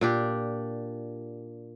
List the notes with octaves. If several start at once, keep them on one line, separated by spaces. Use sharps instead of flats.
A#2 D4 G4